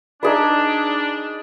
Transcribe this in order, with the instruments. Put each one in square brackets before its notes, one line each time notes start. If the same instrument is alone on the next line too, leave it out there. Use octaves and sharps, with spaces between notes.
[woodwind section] D4 [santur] D#4 G#4 B4